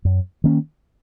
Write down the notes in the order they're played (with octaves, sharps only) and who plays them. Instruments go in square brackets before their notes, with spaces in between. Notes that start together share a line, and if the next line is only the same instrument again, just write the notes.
[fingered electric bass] F#2
D#3 A#3 C#4